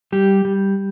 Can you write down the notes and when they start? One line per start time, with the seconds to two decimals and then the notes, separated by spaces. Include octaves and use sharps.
0.12 G3 G4
0.45 G3